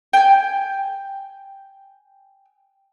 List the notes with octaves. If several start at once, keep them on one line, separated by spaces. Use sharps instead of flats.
G5 G#5